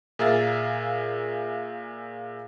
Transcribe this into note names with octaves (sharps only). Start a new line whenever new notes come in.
A#2 G#4 A#4 E5 F5 A6